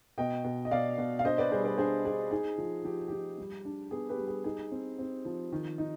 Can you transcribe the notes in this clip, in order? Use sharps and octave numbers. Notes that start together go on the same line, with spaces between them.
B2 D#5 G5
B2
D#5
B2 D5 F5
B2
F5
D4 C5 D#5
B4 D5
G3 G#4 C5
B4 D5
D4 G#4 C5
D4 G#4
D#4 G#4
F3
F3 G4
F3 G4
G3
D4
B3 G#4
G4 B4
G3
G#4
D#4 G#4
C4
C4
F3
D#3
D#4